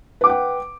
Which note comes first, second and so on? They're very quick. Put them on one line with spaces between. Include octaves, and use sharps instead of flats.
B4 D6 F#5 G5